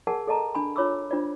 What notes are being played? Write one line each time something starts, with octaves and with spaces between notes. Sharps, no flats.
G#4 A#4 D5 F#5 G#5 A5
A4 D5 D#5 A5 A#5
D4 G#5 B5
D4 F4 C#5 B5 D6 E6
D4 F4 C5 D5